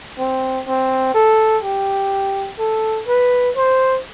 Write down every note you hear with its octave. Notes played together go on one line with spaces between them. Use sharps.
C4
C4
A4
G4
A4
B4
C5